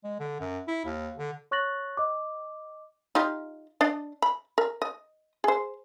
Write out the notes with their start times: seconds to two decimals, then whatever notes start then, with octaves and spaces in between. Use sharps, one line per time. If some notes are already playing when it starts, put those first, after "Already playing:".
0.04 G#3
0.19 D3
0.40 F#2
0.68 E4
0.85 D#2
1.18 D3
1.51 C#5 C#6 F#6 A6 A#6 F#7
1.97 D#5 D6
3.15 D#4 F4 G4
3.81 D4 D5 D#5
4.22 B5
4.58 A#4
4.82 D#5
5.44 G#4 C5